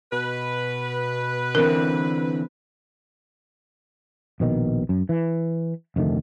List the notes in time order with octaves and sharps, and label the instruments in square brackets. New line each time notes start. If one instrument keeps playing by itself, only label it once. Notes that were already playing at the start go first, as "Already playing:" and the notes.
[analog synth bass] B2 [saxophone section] B4
[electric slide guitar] D3 E3 C4 [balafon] A#4
[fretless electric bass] A#1 B2 D#3
F#2
E3
F1 D2 D#3 A3